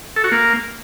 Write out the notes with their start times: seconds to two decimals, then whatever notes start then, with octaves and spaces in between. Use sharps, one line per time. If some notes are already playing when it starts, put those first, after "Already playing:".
0.16 A4
0.24 F#4
0.32 A#3